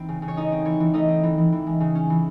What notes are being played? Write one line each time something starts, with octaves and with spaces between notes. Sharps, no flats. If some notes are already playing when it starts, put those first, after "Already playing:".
Already playing: E3 C4 D#4
C#3
C#3
C#5
A3 D#4 D#5
C4
E3 C#5
E3
A3 D#4 D#5
C4
E3
E3
E3
G#3
C#3
C#4
E3